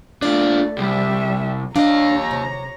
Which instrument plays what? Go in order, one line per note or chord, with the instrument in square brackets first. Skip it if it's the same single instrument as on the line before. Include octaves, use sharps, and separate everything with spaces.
[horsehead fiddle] A3 [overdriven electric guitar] D4 F4 [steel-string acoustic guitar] D5
[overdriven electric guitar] C2 [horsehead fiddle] G3 E5
[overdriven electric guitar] D#2 D#5 [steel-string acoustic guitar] D4 F5 [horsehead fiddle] C#5 A#5
[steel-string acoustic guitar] C3